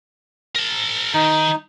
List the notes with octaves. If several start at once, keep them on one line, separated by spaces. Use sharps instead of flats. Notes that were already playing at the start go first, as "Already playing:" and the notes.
A#4 A5
D#3 D#4